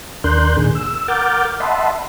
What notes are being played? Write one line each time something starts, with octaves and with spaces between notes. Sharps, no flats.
D#2 D4 A#4 C6 F#6 G6
A#2 D#3 G#4
E6
A#4 F#5 D6 F6 G6 A6
D#5 E5 F#5 A5 B5 C6